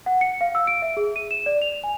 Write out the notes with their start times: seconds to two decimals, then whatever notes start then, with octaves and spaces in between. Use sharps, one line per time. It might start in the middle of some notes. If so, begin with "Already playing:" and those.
0.06 F#5
0.21 C#7
0.41 F5
0.55 E6
0.67 D7
0.82 E5
0.97 G#4
1.16 D#7
1.31 E7
1.46 D5
1.62 F7
1.84 G#5